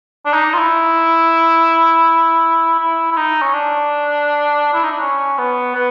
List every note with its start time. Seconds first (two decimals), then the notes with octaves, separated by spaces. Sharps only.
0.26 D4
0.34 D#4
0.53 F4
0.58 E4
2.79 E4
3.12 E4
3.17 D#4
3.42 C#4
3.53 D4
4.74 E4
4.83 D#4
4.91 D4
5.00 C#4
5.38 B3
5.75 B3